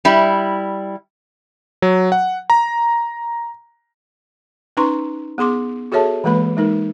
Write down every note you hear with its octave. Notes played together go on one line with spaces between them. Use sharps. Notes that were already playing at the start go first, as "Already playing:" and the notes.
G3 E4
F#3
F#5
A#5
C#4 D#4 B4 A#5 C6 C#6
B3 G#4 C6 D6
F#4 G#4 A4 C#5 E5 A5
E3 G#3 A#3 B4 B5
G#3 D#4 A#4